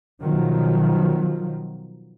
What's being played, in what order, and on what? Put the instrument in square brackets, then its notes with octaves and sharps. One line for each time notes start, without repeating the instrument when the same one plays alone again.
[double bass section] B2 D#3 F3 F#3